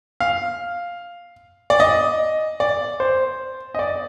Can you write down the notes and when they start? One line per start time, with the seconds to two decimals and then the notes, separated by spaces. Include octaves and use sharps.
0.20 F5
1.70 D5
1.80 D#5
2.60 D5
3.00 C5
3.75 D#5
3.79 D5